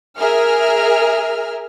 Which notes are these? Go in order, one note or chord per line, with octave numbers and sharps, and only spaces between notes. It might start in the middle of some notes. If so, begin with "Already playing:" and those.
G#4 A#4 E5 F6